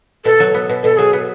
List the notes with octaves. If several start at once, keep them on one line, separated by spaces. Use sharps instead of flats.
B2 A4
F#3
B3
B2
B2 A4
F#3 G#4
B3